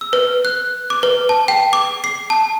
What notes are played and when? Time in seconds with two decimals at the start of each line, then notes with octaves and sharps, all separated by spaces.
0.01 E6
0.13 B4
0.45 F#6
0.90 D6
1.03 B4
1.29 A5
1.48 G5
1.73 D6
2.04 C7
2.30 A5